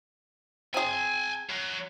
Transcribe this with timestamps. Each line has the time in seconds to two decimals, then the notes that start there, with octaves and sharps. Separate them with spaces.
0.74 C4 G#4 G#5 A5
1.49 F#2